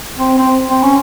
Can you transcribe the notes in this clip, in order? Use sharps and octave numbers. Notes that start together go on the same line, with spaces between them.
C4
C4
C4
C#4